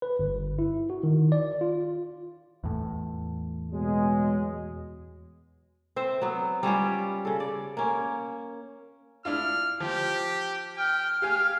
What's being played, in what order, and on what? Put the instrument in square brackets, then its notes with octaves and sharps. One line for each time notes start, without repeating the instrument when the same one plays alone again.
[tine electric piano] B4
G1
E4
F#4
D#3
D5
F4
[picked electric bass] E2 A2
[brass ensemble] B2 F#3 G#3
[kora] C4 C5 E5
F#3 B3
G3 C#4 F4 G4
C#3 A4
D5
A#3 C#4
[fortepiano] D4 E4 F4 [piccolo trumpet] F6
[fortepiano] F3 [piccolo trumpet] G4
[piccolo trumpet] G5 [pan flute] F6
[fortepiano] G4 G#5 [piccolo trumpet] F5